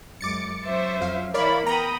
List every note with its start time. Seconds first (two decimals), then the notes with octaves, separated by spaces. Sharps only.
0.21 F#2 G#3 D6 A6 C#7
0.65 F#3 C#4 C5 E5
1.01 F2 F5
1.34 E3 E4 A#4 C#5 D5 F5 B5
1.66 B3 G5 A#5 B5 D#6